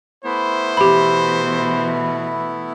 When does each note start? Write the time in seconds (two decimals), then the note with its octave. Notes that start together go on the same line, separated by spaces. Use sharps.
0.24 A3 B3 E4 C5
0.77 B2 E3 G4 B5